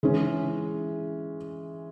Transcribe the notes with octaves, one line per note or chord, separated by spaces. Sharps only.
E3 G#3 C#4